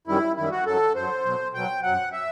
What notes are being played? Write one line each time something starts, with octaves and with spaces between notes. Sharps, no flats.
F#2 D#3 G3 E4
F#2 D#3 G3 E4
F#4
F#2 F#3 A4
F#2 F#3 C5
B2 F#3
B2 F#3 G5
F#2 F#3 F#5
E5